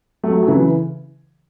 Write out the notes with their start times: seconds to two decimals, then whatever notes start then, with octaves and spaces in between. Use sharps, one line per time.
0.23 F#3 A3
0.43 F#3
0.47 C#3 E3